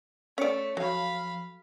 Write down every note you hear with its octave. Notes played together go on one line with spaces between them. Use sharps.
A3 C#4 C#5 D5 C#6 C#7
F3 F#3 F5 B5